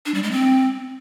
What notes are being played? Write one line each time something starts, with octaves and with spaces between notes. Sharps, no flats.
D4
G3
G#3
C4